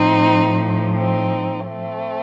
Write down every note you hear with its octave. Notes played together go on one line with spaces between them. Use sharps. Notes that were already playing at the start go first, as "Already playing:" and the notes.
Already playing: A2 F3 C4 D#4
C4 D#4
A3 C4